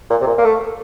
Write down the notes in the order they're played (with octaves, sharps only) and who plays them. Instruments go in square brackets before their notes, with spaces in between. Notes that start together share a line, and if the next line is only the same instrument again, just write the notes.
[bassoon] A#2
C3
A#2
A#3
A3